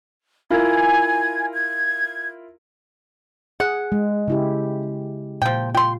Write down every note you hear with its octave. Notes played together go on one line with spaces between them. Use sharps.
E4 F4 A#4 G#5 G#6
G#6
G#4 F#5
G#3
C#3 E4 G4
A#2 F3 G5
F4 G5 C6